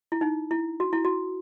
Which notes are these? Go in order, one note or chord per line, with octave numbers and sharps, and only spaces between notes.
E4
D#4
E4
F#4
E4
F#4